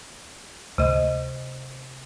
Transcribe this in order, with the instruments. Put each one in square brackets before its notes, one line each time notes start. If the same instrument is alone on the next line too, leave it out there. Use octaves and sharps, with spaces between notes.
[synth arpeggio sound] D2 [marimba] C3 D#5